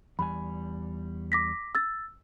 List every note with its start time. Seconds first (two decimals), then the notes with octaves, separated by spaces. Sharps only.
0.19 E2 G3 G#5 B5
1.32 D6 A#6 B6
1.75 E6 A6